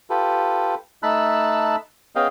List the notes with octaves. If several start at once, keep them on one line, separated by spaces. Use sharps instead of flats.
F4 G4 A4 B4
A3 D#4 A5 B5 E6 F#6
B3 C#4 G#4 D#5 F5 G5